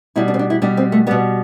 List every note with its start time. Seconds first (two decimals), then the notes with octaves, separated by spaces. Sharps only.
0.16 B2 G3 E4
0.28 D4
0.34 C4
0.39 D4
0.50 E4
0.62 B2 G3 D4
0.77 C4
0.92 A3
1.07 G3 B3
1.11 B2